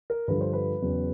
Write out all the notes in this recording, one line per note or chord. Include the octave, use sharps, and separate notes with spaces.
A#4
G2 D3 F3 B4
C5
B4
E2 C#3 F#3